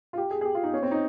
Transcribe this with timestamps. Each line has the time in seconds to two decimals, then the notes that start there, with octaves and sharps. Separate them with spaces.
0.13 F4
0.17 G4
0.31 G#4
0.41 G#4
0.45 G4
0.55 F4
0.63 D#4
0.74 C#4
0.83 C4
0.91 D#4